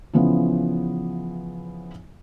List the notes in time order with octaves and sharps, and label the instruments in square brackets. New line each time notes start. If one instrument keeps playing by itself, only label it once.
[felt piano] C#3 E3 F3 B3